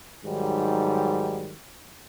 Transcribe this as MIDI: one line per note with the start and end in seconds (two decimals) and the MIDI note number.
0.24 1.55 44
0.24 1.55 51
0.24 1.55 54
0.24 1.55 55